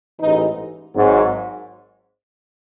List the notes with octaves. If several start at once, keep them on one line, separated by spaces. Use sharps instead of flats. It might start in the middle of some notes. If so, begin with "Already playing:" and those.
A1 G#2 E3 D#4
G#1 G#2 F#3